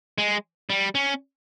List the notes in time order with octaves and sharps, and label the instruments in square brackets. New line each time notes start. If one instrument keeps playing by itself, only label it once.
[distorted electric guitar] G#3
G3
C#4